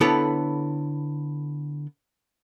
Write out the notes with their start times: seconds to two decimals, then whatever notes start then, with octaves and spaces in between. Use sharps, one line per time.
0.01 D3 B3 E4 A4 B4 C#5